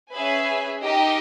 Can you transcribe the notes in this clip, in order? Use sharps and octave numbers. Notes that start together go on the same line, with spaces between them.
C#4 G#4 B4 E5 G#5
D#4 G4 A#4 D#5